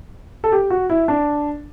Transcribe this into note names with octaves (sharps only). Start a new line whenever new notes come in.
A4
G4
F#4
E4
D4